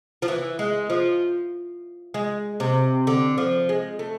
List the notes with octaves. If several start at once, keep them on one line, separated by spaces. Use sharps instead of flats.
F3
E3
G#3
F3
G#3
C3
D3
F3
G#3
A3